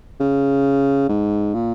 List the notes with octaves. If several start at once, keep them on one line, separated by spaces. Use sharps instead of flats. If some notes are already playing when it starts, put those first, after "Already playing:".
C#3
G#2
A#2